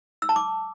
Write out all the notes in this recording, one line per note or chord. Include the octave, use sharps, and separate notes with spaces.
E6
A5
D6